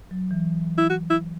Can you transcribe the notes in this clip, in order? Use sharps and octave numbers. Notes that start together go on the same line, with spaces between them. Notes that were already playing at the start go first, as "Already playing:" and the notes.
F#3
E3
E4
F#4
E4